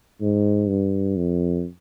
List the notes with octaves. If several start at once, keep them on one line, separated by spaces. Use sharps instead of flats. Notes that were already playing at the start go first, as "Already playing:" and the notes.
G#2
G2
F2